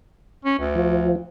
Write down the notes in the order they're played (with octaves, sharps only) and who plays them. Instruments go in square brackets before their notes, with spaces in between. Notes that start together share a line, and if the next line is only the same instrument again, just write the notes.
[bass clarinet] C#4
D2
[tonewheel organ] F3